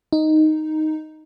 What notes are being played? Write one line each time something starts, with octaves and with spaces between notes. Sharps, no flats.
D#4